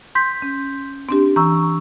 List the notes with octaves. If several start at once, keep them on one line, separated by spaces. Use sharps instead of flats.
C6 G6 B6
C#4
C4 D4 G4
E3 A#5 C#6 E6